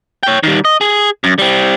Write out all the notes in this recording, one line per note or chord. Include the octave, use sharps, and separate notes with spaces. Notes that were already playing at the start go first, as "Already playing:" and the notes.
C#5 G5
D#3 G3
D#5
G#4
F#2
G3 C4